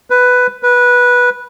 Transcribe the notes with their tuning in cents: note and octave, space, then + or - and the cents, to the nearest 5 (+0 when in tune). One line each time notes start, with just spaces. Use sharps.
B4 +5
B4 -15